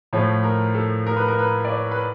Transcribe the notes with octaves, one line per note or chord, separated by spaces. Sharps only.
A2 F3 A3 C#5
A#4
A4
A#4
B4
A#4
B4
D5
C#5
B4